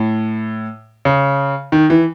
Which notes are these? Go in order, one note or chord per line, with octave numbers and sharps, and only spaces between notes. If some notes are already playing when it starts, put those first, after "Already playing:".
Already playing: A2
C#3
D#3
E3